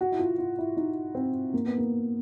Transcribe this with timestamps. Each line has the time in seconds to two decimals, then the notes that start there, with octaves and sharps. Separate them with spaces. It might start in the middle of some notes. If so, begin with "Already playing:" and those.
0.01 F#4
0.12 E4
0.19 F4
0.38 F4
0.59 E4
0.77 D#4
1.15 C4
1.54 A#3
1.66 B3
1.78 A#3